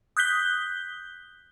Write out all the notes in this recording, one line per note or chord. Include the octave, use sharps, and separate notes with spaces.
D#6 F#6 G6 B6 G7